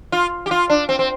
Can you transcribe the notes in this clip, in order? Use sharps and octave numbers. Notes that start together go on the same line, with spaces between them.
F4
G4
F4
D4
C4
C4